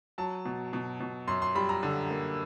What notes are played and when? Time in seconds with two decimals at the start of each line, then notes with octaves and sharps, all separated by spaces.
0.18 F#3 A5
0.45 B2
0.73 B2
1.00 B2
1.28 F#2 C6
1.42 C6
1.55 G3 B5
1.69 A#5
1.83 D3
2.10 A#3